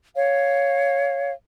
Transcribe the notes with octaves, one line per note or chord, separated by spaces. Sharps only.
C#5 F5